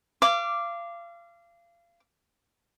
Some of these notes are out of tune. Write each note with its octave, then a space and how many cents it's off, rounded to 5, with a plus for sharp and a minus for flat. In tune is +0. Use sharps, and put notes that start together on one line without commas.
F5 -30 D6 +0